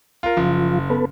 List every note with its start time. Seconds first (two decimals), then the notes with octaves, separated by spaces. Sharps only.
0.23 F4 A#4
0.37 F#1 F3 F4
0.90 B3 A4 B4